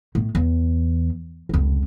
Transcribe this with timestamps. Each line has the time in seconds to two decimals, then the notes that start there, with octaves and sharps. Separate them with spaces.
0.15 A2
0.35 E2
1.49 F1 C#2